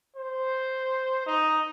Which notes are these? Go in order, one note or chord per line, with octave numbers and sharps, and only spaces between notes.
C5
D#4